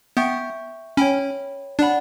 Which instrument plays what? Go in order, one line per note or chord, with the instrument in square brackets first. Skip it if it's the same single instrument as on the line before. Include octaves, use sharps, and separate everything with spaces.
[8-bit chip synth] B3 [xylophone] E5 G5 C#6 G6
[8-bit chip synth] C#4 [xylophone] C#5 G5 B5
[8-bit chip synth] D4 [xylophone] D5 F#5 B5